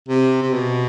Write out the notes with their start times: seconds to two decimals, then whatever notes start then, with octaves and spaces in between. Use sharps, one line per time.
0.08 C3
0.42 C3
0.53 B2